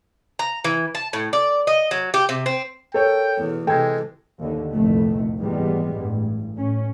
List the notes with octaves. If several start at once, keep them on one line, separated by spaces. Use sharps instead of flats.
A#5
E3
A5
A2
D5
D#5
F#3
G4
C3
C4
A4 A#4 C#5 G5
E2 B2
C3 E3 G#3 A4 G5 G#6
D#2 D3
F1 C2 F2 A#2 D#3 A3
G#1 E2 B2 G3 G#3 B3
A1 G2
A1 C#4